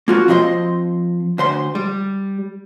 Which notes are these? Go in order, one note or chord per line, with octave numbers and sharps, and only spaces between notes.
A#3 F4 F#4
F3 C4 C5 D#5 C6
D2 C5 C6
G3